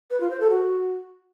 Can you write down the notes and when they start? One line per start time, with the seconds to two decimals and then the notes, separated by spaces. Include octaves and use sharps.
0.10 B4
0.20 F4
0.30 C5
0.40 A4
0.50 F#4